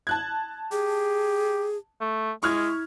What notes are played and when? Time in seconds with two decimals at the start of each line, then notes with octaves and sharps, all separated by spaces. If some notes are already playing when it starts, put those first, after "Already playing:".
0.07 A5 F#6 G#6
0.72 G4 G#4
2.01 A3
2.43 G#3 E4 C#6 F6 G#6